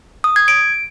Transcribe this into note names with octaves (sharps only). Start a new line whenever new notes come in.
D#6
G#6
D7